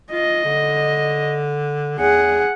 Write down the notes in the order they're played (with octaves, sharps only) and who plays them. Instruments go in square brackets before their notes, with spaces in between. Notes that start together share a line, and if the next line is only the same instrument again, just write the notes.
[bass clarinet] F4 [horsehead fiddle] D#5
[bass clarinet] D3
[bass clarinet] E2 [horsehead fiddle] G#4 F#5